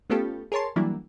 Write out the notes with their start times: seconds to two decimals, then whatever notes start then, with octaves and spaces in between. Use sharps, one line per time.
0.10 A3 B3 C#4 F4 G4 A4
0.52 G#4 A#4 C#5 A5 C6
0.76 E3 F#3 G3 A#3 D4 E4